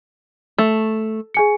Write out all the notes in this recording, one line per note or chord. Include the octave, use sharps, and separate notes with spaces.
A3
G#4 G#5 C#7